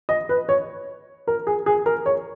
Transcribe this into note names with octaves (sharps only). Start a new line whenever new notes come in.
D#5
B4
C#5
A#4
G#4
G#4
A#4
C#5